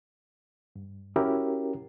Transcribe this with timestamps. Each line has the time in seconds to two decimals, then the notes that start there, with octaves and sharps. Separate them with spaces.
0.76 G2
1.16 C#4 E4 F#4 G4 A#4